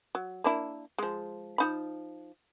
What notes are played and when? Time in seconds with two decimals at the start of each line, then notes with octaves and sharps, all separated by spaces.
0.15 F#3
0.44 A#3 D4 E4
0.98 F3 G#3
1.58 F3 D#4 B5